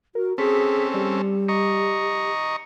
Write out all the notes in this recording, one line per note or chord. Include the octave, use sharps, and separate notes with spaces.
F#4 A#4
C4 C#4 G#4 A4 B6
G3 G4
D#5 A#5 C#6